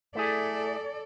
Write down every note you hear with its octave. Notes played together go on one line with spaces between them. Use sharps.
A3 E4 G#4 A4 D5